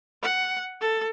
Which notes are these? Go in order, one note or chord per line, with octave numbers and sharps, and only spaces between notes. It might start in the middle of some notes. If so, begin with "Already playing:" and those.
F#5
A4